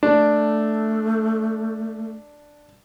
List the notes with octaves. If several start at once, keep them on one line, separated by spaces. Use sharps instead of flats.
A3 D4